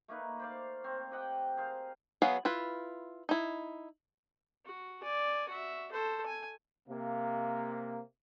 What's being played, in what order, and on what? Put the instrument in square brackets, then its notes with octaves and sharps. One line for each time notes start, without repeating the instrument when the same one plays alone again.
[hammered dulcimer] A3 A#3 D#4 B4
C5 D5 F5
C4 C#5
G4 D#5 F#5 G5
G#4 A#4 C5 F5
[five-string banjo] F#3 B3 G#4 B4 F5
E4 F4 B4
D#4 E4
[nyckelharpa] F#4
D5 G#5
F#4 E5
A4 C5
G#5
[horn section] C3 A#3